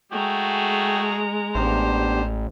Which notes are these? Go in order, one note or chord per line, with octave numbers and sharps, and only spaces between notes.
G#3 A3 F#4 G#4 G5 A#5
A1 B3 D4 G4 C5